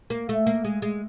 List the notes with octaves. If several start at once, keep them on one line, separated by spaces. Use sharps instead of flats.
A#3
A3
A#3
G#3
G#3